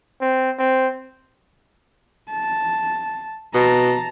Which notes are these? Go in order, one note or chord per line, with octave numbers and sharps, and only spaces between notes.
C4
C4
A5
B2 A5 A#5